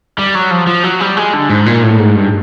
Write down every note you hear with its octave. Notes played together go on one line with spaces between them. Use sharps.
G3
F#3
F3
F3
F#3
G3
G#3
D3
G#2
A#2
A2
G#2
G2